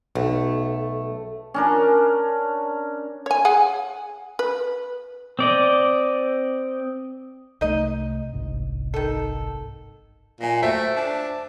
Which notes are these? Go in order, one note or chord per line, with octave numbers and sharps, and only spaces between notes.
B1 A3
C#4 D4 A#4
C#5 G#5
G#4 F#5 G#5
B4
C4 D5 D#5
C2 A3 D#4 D#5
G1 C2 G#2
D#3 A4
A#2 D#5 G#5
A3 F#4 C5 E5 G5
D4